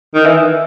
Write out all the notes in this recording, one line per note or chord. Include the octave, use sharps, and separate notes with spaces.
D#3
E3